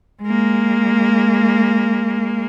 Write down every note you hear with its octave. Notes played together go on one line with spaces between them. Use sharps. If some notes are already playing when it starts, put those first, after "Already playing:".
G#3 A#3